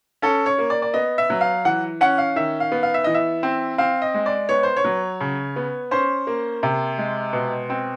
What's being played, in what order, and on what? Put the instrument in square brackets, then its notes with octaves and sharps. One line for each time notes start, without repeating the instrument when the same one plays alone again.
[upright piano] C#4 A4
C#5
A#3
D5
D5
B3 D#5
E5
F#3
F5
E3 F#5
C#4 F#5
F5
D#3 E5
F5
B3
F5
E5
E3 D#5
E5
C4
C4 F5
D#5
G#3
D5
B3 C#5
C5
C#5
F#3
C#3
B3
C#4 C5
A#3
C3
G#3
B2
C4